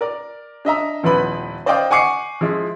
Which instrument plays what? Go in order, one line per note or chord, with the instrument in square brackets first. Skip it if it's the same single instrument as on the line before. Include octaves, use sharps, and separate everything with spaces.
[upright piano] A#4 D5
D4 D#5 E5 A#5
D#1 F3 B3 E4 B4 B5
C5 D5 D#5 F5 G5 D6
F#5 G#5 C#6 D6 C7 C#7
F3 G#3 E4